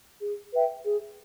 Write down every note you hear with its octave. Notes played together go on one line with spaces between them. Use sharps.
G#4
B4 E5 G5
G#4